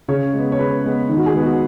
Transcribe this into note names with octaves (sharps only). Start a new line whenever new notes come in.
C#3 C#5
G#3 B3
C#5
C#3 B4
G#3 B3
D#3
F#4
G#4
G#3 B3
F#4